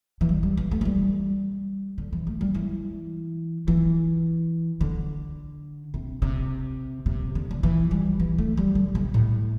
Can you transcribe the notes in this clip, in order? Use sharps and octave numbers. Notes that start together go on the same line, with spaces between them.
E3
G3
G3
E3
A3
E3
G3
D3
E3
A3
G3
E3
E3
D3
C3
C3
C3
D3
D3
E3
G3
E3
A3
G3
D3
C3
A2